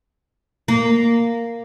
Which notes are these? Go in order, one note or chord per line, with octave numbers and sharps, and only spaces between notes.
A#3